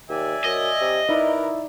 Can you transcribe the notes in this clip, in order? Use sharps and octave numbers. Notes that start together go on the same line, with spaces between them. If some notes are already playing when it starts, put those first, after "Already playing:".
D#2 D5 E5 G#5
F#2 D#5
C3
D#4 E4 A#4 B4 D5